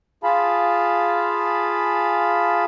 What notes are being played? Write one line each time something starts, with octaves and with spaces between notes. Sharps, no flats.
F4 G#4 F5 A5 B5